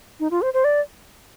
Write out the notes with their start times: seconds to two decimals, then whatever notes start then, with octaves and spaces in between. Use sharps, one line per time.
0.20 D#4
0.31 F4
0.42 C5
0.54 C5
0.64 D5